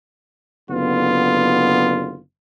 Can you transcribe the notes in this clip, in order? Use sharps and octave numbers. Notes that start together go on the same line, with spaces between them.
F#1 D3 B3 F4